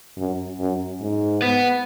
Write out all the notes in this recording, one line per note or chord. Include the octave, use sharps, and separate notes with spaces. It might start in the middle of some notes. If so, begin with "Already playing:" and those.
F#2
F#2
G#2
B3